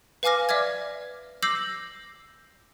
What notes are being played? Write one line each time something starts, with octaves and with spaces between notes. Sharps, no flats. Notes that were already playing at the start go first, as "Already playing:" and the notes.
B4 F5 G#5 D6 F6 A#6
D5 E5 D6 F6 G#6
D6 E6 G6 A#6 C7 F#7